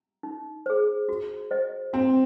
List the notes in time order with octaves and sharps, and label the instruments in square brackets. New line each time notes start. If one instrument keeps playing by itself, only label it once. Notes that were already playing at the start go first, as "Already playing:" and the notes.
[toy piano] D#4
G#4 C5
F#4
C5 D#5
[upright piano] C4 [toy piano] F#4